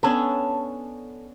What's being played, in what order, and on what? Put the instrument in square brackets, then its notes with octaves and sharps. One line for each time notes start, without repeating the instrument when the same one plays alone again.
[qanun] B3 C#4 D4 [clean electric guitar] A4